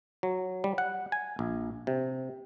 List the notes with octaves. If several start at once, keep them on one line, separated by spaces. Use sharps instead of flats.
F#3
G3
F#5
G#5
A#1
C3